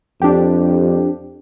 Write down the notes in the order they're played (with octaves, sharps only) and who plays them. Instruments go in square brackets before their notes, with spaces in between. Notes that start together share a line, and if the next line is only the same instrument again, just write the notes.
[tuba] F2 [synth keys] D4 G4